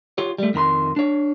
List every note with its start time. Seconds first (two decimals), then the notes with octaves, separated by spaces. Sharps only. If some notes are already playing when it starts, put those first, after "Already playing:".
0.18 F4 G4 C#5
0.38 G3 A3
0.54 F2 D#3 B5 C6
0.96 D4 C#5